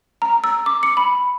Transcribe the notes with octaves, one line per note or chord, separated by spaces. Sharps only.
A#5
E6
D6
C#7
B5